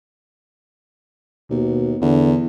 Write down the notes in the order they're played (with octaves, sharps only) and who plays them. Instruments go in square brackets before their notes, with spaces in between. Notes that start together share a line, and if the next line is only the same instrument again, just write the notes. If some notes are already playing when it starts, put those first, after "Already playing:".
[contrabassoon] D#2 [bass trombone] B2
[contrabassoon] E2 [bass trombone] D3